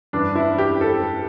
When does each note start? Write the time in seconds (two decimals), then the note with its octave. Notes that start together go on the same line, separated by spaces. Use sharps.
0.13 G2 E3 D4
0.35 E4
0.58 G4
0.81 A4